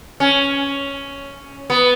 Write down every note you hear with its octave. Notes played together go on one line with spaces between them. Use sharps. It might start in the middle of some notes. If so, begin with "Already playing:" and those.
C#4
B3